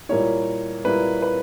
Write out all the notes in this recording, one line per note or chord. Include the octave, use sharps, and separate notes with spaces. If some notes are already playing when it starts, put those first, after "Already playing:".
A#2 G3 A#3 E4 C#5
A#2 G3 A#3 E4 B4
B4